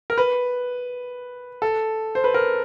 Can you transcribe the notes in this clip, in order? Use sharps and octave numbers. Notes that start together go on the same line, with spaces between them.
A#4
B4
A4
C5
B4
A#4